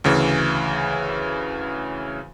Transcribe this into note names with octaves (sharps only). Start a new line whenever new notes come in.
D2 C#3 E3